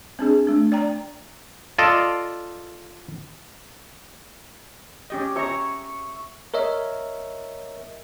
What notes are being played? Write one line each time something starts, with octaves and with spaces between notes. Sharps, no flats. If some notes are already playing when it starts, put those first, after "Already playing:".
C4 D4 G#4
A3 D4
D5 G5 A#5
F4 A4 D5 D#5
C#4 G4 D#5
C#5 E5 A#5 C#6
A#4 C#5 D#5 E5